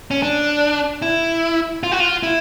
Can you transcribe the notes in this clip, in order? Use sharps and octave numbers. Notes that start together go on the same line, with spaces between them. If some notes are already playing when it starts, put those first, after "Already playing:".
C#4
D4
E4
F4
F#4
F4
E4